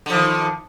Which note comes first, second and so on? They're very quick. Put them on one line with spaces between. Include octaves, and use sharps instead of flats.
D3 F3 D#3